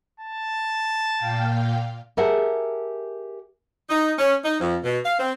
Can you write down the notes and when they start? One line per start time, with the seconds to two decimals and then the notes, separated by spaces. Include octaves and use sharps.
0.20 A5
1.17 A#2 F5 G5
2.17 G4 G#4 A#4 E5 F#5 A5
3.90 D#4
4.19 C#4
4.45 D#4
4.60 F2
4.85 B2
5.05 F5
5.19 C4